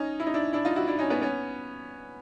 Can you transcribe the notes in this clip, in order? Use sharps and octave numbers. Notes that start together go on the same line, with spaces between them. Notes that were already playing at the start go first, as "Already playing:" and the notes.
Already playing: C#4 D#4
E4
D#4
D4 E4
D4 E4
D#4 F4
E4 F#4
D4 E4
C#4 D#4
B3 C#4
B3 C#4